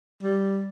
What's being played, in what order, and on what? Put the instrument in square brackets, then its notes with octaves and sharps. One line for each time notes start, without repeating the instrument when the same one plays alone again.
[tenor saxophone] G3